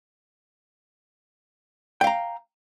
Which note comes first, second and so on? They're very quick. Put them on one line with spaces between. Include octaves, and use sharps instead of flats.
G5 F5 A#5